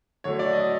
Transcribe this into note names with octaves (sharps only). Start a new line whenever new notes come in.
D3 F#3 A3 C#5
D5
D#5